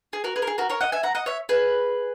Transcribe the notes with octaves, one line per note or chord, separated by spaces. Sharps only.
G#4
F#4 A#4
G#4 B4
A#4
G#4
F#4 A#4
A#4 C#5
D#5 F#5
E5 G#5
F#5 A#5
D#5 F#5
C#5 E5
G#4 B4